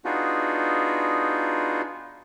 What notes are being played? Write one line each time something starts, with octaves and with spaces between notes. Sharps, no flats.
B3 D4 D#4 F4 F#4 G#4